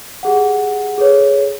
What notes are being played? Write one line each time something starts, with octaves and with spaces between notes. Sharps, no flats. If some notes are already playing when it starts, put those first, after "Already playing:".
G4 G#4 F#5
G#4 A4 B4 C#5